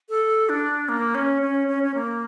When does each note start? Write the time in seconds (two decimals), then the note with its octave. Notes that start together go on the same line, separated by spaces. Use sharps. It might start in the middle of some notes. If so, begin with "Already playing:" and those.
0.09 A4
0.49 D4
0.89 A#3
1.15 C#4
1.42 C#4
1.68 C#4
1.83 C#4
1.94 A#3